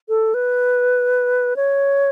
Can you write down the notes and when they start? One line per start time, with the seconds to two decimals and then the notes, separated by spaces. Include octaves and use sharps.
0.09 A4
0.34 B4
1.56 C#5